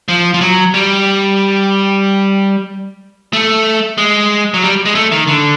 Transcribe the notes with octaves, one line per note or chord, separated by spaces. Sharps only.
F3
F3
F#3
G3
A3
G#3
F#3
G3
G#3
A3
D#3
D3